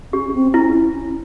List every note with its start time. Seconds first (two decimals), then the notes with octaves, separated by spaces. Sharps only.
0.13 C#4 G4
0.34 C4
0.54 C#4 E4
0.74 E4
0.95 C#4